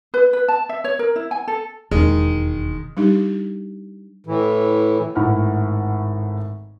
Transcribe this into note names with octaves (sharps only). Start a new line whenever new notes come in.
B4
B4
A5
E5
C#5
A#4
E4
G#5
A4
E1 D#2 D#3 G#3
G3 D4 D#4 G4
A2 E3
G#1 A2 F#5 F6